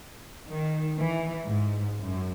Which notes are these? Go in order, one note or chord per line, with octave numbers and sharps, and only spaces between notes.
D#3
E3
G#2
F#2